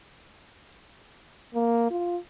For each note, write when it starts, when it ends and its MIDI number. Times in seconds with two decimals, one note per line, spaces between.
1.55 1.91 58
1.91 2.17 65